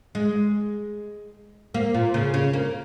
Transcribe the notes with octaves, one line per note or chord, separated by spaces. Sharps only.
G#3
A#3
A#2
C#3
C#3
A#3